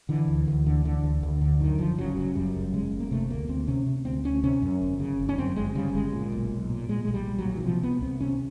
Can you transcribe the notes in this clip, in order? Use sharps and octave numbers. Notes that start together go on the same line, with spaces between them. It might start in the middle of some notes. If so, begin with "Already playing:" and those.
D3 E3
D2
D2
D3
D3
D2
D2
D3
F#2 D#3
F#1 F3
C#3 F#3
F#1 F#3
F#2 G3
F#1
C#3 G#3
F#1
A#3
C3 A3
D2 A#3
D2 C4
C3 C#4
C3
D2 C4
D2 C#4
C3 C#4
F#2
G1
C#3
G1
C#4
F#2 C4
G1 G#3
C#3 G3
G1 G#3
A#2
B1
B1
A#2
A#2 G#3
B1 G#3
G3
B1
F#3
A#2
E3
C3 F3
C2 B3
C2 C4
C3 C#4